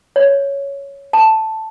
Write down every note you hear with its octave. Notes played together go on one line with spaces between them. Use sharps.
C#5
A5